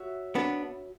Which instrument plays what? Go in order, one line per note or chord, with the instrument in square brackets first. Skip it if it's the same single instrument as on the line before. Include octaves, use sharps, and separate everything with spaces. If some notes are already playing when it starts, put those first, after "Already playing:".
Already playing: [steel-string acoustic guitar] F#4 C#5 E5
[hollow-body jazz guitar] B3 D4